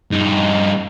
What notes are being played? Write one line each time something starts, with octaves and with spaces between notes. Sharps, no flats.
G2 D#4